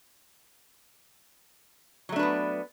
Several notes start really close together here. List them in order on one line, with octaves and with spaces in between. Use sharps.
F#3 A3 D4 B4 B3